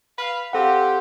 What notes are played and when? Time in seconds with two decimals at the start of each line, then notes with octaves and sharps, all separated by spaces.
0.18 B4 F5
0.53 C4 G4 A4 F5 F#5